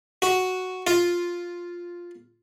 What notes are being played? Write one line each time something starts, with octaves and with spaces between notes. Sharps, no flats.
F#4
F4